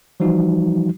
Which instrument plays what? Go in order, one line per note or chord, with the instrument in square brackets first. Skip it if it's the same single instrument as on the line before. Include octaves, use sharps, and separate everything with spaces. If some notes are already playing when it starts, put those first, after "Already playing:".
[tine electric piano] E3 F3 G3 D#4 F#4